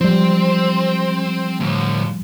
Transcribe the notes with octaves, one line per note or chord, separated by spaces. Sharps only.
F3 G3 C4
D2 A2